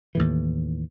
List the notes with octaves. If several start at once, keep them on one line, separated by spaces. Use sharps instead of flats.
D#2 A2 E3